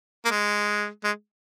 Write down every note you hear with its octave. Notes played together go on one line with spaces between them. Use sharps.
A#3
G#3
G#3